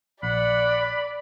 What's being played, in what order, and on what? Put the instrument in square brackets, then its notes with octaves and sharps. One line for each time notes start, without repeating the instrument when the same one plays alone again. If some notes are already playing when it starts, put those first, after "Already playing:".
[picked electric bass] A#1 [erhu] D5 [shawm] F#5 [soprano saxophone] B5